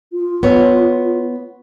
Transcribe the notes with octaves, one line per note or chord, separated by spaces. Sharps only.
F4
B3 C#5